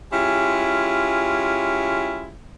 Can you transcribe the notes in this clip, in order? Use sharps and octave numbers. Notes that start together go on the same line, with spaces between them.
G#3 C#4 E4 F4 G4